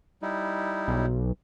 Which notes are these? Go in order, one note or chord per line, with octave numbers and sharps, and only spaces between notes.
G3 D#4 E4
B1